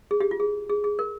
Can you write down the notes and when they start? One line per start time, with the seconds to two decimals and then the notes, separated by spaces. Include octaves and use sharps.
0.11 G#4
0.20 G4
0.31 F4
0.40 G#4
0.70 G#4
0.84 G#4
0.99 A#4